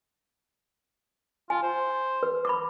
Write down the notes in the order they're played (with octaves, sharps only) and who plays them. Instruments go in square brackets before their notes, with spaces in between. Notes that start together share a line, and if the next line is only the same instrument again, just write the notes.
[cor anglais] F4 [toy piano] G#5
[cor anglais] C5
[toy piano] B4
B5 C#6 D6